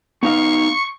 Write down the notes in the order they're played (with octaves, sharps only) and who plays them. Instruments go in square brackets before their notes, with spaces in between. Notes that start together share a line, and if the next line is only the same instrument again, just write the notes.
[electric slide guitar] B3 D#4 F5 [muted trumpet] C#6